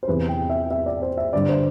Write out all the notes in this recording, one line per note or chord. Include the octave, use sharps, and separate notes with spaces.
C5
E2 C3 E3 B4
G5
E5
E5
D5
C5
E5
G2 D3 D5
C5